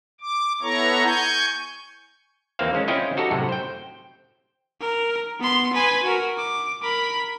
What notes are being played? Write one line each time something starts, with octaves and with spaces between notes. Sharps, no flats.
D6
B3 E4 A4 C#5 A#5 C#6
G#5 C#6 G6
D#2 E3 A#3 C4 C5 F5
G#3 C#4
C4 C#4 E4 F4 D#5 G5
D#4 F#4 G4 A4
F#2 A2 C3
C5 G5
A#4
B3 C6
B4 G#5
F#4 A#4
D6
A#4 B5